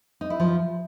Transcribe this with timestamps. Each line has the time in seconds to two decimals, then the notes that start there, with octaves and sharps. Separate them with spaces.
0.21 D#4
0.30 E4
0.40 F3